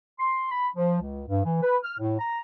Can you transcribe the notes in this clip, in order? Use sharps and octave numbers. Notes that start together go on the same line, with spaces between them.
C6
B5
F3
C#2
G2
E3
B4
F6
A2
A#5